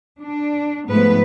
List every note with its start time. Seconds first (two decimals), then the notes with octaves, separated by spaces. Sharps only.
0.21 D4
0.89 G#2 F3 A3 B3 B4